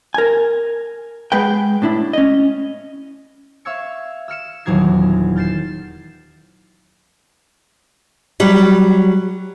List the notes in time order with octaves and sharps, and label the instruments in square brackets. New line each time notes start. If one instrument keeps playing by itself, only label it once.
[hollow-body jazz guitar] A#4 G#5
G#3 G#4 B4 F#5 G5
A2 D4 E4
C#4 D#5
[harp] E5 F5 C#6 E6 G#6 C#7
E6 F6 C#7 E7
D#1 E2 F#3 D#4 G#6 C7
F6 G6 A6 C7 E7
[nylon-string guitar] F#3 G3